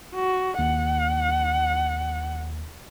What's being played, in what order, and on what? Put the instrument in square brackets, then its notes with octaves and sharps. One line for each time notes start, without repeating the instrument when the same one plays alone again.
[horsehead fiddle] F#4
[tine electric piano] D#2 [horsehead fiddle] F#5